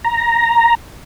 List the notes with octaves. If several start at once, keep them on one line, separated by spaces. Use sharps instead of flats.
A#5